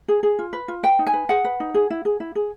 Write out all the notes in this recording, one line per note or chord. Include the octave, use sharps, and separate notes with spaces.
G#4
G#4
F4
B4
F4
B4 G5
D#4
G#5
B4
G#4 F#5
B4
D#4
G#4
E4
G#4
E4
G#4